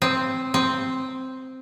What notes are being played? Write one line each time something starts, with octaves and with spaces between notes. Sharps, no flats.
C4
C4